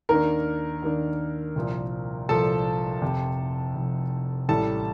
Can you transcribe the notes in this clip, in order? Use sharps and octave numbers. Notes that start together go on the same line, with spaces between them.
D#2 D#3 A#3 D4 A#4 A#5
D#2 D#3 A#3 D4
C2 A#2 F3
C2 A#2 F3 A4 A5
F1 F2 C3
F1 F2 C3
A1 A2 G3 A4 A5